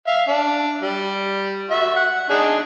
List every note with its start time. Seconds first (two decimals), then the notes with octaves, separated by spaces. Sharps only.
0.07 E5 F5
0.28 D4
0.82 G3 D5
1.70 F#4 E5
1.96 F#5
2.29 D4 D#4 G#4